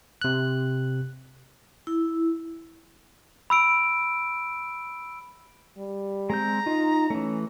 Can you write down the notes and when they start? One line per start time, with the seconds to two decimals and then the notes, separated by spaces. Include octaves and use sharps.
0.21 C3 F#6
1.87 E4
3.50 B5 E6 D7
5.78 G3
6.30 G#3 C4 A#5 G6
6.66 D#4 F4
7.10 E3 A3 C#4